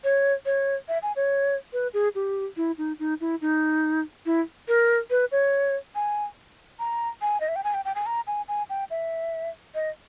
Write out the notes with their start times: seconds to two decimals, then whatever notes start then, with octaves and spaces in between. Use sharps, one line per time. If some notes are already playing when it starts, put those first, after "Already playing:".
0.04 C#5
0.46 C#5
0.88 E5
1.03 G#5
1.16 C#5
1.73 B4
1.94 G#4
2.15 G4
2.57 E4
2.78 D#4
2.99 D#4
3.21 E4
3.41 D#4
4.26 E4
4.68 A#4
5.10 B4
5.32 C#5
5.95 G#5
6.79 A#5
7.22 G#5
7.41 D#5
7.49 E5
7.56 G5
7.64 G#5
7.74 G5
7.85 G5
7.95 G#5
8.06 A#5
8.27 G#5
8.48 G#5
8.70 G5
8.91 E5
9.75 D#5